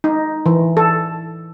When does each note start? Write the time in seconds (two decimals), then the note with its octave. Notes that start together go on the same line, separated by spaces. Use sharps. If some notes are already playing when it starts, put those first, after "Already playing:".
0.04 D#4
0.46 E3
0.77 A4